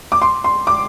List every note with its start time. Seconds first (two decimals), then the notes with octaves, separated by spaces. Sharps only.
0.12 D6
0.22 C6
0.44 C6
0.67 D6